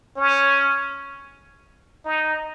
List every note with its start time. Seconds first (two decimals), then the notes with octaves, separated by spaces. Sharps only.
0.16 C#4
2.05 D#4